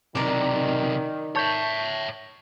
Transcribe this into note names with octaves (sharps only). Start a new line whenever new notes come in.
B1 C3 D#3 A#4 D5
C#5 E5 A5 C#6 G6